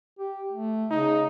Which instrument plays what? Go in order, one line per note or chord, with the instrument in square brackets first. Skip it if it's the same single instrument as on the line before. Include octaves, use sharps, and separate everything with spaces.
[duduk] G4
A3
[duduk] C#3 [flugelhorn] D#4